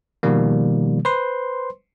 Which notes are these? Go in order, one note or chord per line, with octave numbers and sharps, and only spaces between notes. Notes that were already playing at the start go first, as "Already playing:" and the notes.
B2 D#3 F3 G3 A#3
B4 C5 C6